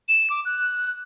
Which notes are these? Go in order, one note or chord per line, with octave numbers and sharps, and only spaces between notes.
E7
D6
F#6